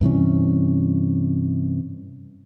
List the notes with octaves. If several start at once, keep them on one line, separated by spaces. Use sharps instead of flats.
G2 C3 E3 C#4